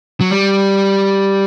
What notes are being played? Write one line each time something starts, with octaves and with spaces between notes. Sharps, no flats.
F#3
G3